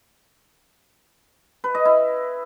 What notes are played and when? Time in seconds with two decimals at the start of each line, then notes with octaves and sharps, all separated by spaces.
1.64 B4
1.75 D#5
1.85 E4